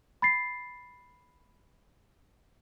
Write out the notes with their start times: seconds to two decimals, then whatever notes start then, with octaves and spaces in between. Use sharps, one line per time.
0.22 B5 A6 C7